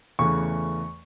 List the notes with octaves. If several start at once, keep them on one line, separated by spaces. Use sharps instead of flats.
E2 C#3 E3 A3 C#6